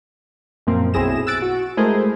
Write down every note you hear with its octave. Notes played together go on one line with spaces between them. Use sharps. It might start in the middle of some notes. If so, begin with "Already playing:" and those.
F#2 A#2 F3 A#3 C4
B1 C4 E4 G#4 A#6 E7
E6 F#6 A6 D7
F#4
G#3 A3 E4 G#4 A#4 C5